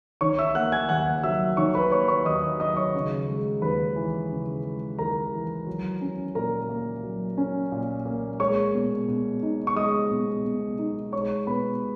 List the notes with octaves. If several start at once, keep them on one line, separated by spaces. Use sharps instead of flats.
D#3 C#5 C#6
E5 E6
A#3 F#5 F#6
G#5 G#6
D#2 F#5 F#6
F#3 E5 E6
D#3 C#5 C#6
B4 B5
A#3 C#5 C#6
C#5 C#6
D#2 D#5 D#6
F#3 D#5 D#6
C#5 C#6
C#3
G#3
D#2 B4 B5
E3
C#3
G#3
D#2 A#4 A#5
E3
F#3
C#4
A#2 A#4 A#5
A#3
F#3
C#4
A#2
A#3
G#3 C#5 C#6
B2
B2
D#4
C#6
G#3 D#5 D#6
B2
B2
D#4
G#3 C#5 C#6
B2 B4 B5